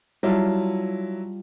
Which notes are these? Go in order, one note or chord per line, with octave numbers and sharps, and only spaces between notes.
F#3 G3 E4 F4 A5